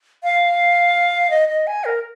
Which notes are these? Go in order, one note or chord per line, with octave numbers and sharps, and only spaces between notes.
F5
D#5
D#5
G#5
A#4